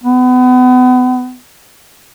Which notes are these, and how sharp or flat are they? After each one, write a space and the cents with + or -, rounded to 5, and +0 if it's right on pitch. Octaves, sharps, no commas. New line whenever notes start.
B3 +30